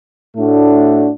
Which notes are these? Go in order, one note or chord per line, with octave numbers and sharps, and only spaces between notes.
A2 A3 D4 F#4